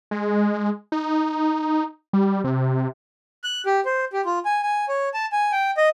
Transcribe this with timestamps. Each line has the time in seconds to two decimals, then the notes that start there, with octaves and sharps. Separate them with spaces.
0.11 G#3
0.92 D#4
2.13 G3
2.44 C3
3.44 F#6
3.66 G4
3.86 C5
4.13 G4
4.25 F4
4.45 G#5
4.62 G#5
4.89 C#5
5.14 A5
5.32 G#5
5.52 G5
5.77 D#5